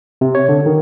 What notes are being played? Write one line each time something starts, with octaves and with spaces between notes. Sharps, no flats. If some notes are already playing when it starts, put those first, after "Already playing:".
C3
C#5
D3
D#3